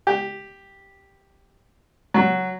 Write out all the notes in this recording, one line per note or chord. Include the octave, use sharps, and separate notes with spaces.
G4
F#3